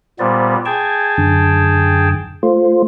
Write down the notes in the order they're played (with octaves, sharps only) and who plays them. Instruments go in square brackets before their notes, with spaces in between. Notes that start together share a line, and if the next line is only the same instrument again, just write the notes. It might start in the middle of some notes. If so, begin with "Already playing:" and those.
[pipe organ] A#2 G3 B3 [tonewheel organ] C5 A5
[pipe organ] G#4 G5 A5 [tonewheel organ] G#6
[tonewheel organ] F#2 D3
A3 F4 C5